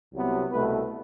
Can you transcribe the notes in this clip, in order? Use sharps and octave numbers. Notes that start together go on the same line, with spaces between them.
C2 C3 F#3 B3
C2 B2 A3 B4